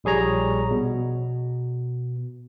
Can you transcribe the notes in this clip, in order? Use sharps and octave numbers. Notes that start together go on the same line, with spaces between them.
A#1 G3 G#4 C#5 A#5
B2